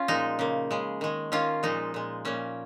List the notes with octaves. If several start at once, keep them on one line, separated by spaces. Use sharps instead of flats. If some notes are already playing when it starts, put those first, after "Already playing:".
Already playing: C#4 F4
A#2 F3 G#3 D#4
C#3 A#3
C#3 G#3
D#3 G#3
D#3 A#3 C#4 F4
A#2 F3 G#3 D#4
A#2 G#3
A#2 F3 A#3 C#4